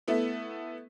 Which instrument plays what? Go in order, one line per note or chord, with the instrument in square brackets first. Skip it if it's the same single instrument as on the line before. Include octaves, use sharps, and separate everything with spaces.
[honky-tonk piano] A3 B3 E4